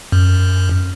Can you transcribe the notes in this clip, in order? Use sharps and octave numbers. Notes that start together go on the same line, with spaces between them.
F#2